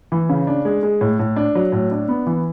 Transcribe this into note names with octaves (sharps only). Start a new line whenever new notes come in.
E3
C#3
D4
G#3
G#3
A2
A2
D4
F#3
A2
D4
B3
E3